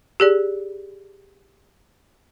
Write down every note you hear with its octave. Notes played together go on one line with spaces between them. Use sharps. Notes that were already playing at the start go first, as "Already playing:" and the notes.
G4 G#4 D5